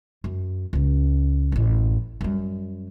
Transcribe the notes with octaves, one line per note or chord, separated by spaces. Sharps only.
F#2
C#2 C#4
A1 F#2
F#2 G3